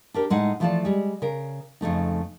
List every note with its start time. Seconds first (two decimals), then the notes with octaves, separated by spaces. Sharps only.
0.14 D4 G4 A#4
0.30 A2 G#3 D#4 F#5
0.60 E3 F3 A3 F4 D5 A5
0.85 G3 G#3
1.22 C#3 A#4
1.81 F2 C#3 A3 D#4